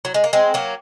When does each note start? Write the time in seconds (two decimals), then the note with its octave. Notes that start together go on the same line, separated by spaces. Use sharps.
0.05 F#3
0.14 G#3
0.24 A#3
0.33 G#3 C4
0.54 F#3 A#3